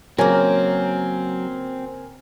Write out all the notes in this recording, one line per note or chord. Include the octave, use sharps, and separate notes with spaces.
C#3 F#3 A#3 C4 A#4 G#5